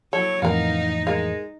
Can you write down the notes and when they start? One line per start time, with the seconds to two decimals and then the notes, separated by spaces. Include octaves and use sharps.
0.13 F#3 E4 A4 C#5
0.42 F2 A2 E3 B3 D#4 A#4 F5
1.07 G#3 A#4 F5